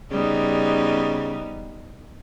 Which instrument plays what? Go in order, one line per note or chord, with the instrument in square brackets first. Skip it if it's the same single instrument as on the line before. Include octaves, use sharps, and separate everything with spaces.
[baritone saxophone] C#3 [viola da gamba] G3 B3 D#4